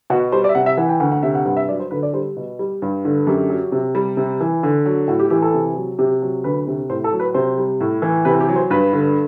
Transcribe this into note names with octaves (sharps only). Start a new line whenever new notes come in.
B2 F#4
G3 C5
D5
E5
C3 F#5
E5
E3 F#5
G5
D2 F#5
F#5
C3 E5
F#5
G2 F#5
E5
F#3 D5
C5
D3 B4
D5
G3 C5
B2
G3
G2
D3
F#2 G4
F#3
C3
G3
C3
E3
D3
F#3
A2 F#4
G4
E3 G4
A4
C3
F#3
C3 G4
F#3
D2 B4
C3
A2 C5
A4
F#3
B4
C3 C5
G3
A2
E3
C3 B4
G4
F#3
C5
G2 B4
D3